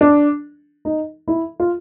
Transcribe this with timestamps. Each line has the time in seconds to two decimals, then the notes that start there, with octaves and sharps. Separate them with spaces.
0.01 D4
0.85 D#4
1.28 E4
1.60 F4